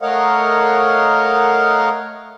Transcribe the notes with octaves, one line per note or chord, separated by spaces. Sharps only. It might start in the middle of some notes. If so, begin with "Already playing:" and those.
A3 A#4 C#5 D#5 F5 F#5